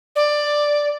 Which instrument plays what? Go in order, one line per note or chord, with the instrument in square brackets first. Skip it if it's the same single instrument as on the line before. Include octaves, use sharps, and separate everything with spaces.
[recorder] D5